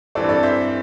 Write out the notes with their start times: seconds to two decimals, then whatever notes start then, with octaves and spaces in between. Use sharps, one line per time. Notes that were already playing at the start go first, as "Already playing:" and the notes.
0.15 G2 E3 C4 A4 D5
0.29 A4 D5
0.43 C5 E5